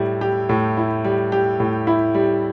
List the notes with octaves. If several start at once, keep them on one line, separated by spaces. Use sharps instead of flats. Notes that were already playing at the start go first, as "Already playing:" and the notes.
Already playing: A2 G3 E4
G4
A2
E4
G3
G4
A2
E4
G3